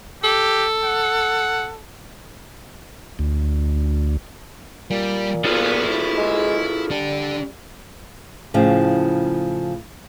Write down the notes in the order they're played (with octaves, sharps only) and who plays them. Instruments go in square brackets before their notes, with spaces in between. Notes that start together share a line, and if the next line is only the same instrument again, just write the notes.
[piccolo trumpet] G4 [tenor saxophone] A4
[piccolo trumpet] F#5
[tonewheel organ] D2
[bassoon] A#2 [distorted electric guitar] G3
[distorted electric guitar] B3 [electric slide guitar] F4 G#4 A4
[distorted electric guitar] E4
[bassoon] G#3
[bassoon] G3 [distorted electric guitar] D4 A4
[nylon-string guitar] A2 C#3 F3